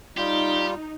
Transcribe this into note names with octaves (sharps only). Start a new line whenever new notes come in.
G3 D#4 F4 G4